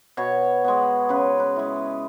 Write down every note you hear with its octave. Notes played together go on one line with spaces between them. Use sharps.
B2 C#5
G#3 B3
C#3 B4
B4
E3 G#3